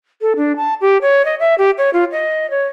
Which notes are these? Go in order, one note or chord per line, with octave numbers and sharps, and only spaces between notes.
A4
D4
A5
G4
C#5
D#5
E5
G4
C#5
F4
D#5
C#5